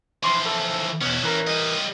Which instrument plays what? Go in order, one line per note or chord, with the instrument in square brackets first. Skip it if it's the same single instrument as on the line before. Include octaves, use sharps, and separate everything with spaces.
[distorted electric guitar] E3 F3 [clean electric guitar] C6
[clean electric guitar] A4
[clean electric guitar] E2 B2 [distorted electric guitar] C#4 E4
[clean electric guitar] E3 A#4
[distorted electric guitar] G3 D#5